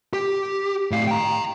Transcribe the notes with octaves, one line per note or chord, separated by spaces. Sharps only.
G4
A2 F5
G5 A#5